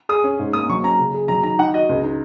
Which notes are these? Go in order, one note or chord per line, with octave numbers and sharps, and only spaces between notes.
G#4 D#6
C#4
G#2
A#3 D#6
F#3 C#6
C#4 A#5
C#3
G#4
F#3 A#5
D#3 A#5
D#4 F#5
F#4 D#5
C#2
D#4